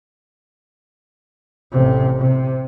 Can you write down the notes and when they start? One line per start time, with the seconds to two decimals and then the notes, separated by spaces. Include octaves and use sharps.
1.72 A1 C3
2.19 C3